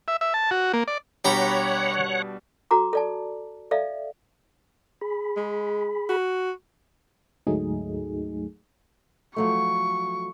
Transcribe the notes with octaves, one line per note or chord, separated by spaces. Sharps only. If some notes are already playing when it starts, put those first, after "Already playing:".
E5
E5
A5
F#4
A#3
D5
B2 G3 D4 G4 C#5 F#5 A#5 B5
F#4 A4 A#5 D6
A4 D5 A5
A4 D5 E5 F5
G#4 B5
G#3
F#4
D2 G#2 F#3 A3 D#4 G#4
F3 F#3 A3 C#6